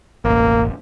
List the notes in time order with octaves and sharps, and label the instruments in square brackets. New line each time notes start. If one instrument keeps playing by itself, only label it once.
[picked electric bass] E1 A1 [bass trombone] A#3